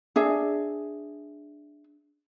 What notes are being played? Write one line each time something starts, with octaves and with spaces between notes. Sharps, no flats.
D4 G#4 E5